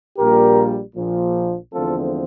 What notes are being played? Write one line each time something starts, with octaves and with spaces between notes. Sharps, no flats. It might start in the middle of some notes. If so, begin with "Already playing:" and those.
A#1 A#2 G3 A#3 G4 A#4
A#1 A#2 F3
E2 D3 F3 A3 C4 F4 A4